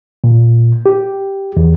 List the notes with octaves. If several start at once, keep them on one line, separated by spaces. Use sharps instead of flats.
A#2
G4
E2